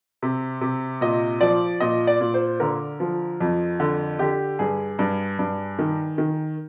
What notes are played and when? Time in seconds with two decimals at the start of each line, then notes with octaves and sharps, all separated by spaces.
0.22 C3
0.61 C3
1.01 A#2 D#5
1.41 F3 D5
1.80 A#2 D#5
2.07 D5
2.21 A#2
2.34 C5
2.60 D3 A#4
3.00 F3
3.40 F2
3.80 D3
4.19 D3 G4
4.59 G2 G#4
4.99 G2
5.39 G2
5.79 D#3
6.18 D#3